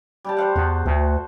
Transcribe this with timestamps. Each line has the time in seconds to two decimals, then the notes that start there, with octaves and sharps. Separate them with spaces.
0.24 G3 G4 A5
0.37 C5 F5 F#5
0.56 E2 F#4
0.86 D2 A4